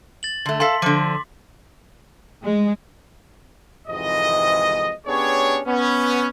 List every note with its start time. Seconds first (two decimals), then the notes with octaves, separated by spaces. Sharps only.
0.23 A6 F#7
0.46 D3 A3
0.60 A4 F5 A5 C6 B6
0.82 D3 F3 D6
2.43 G#3
3.88 G#1 F2 G#2 C3 E3 D#5
5.07 B3 C#4 D4 G4 G#4 C#5
5.66 B3 C#4